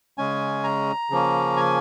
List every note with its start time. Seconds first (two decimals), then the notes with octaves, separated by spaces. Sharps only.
0.18 C#3 G#3 C#4 G#5
0.64 A#5
1.10 C#3 F3 A#3 C#4
1.57 G#5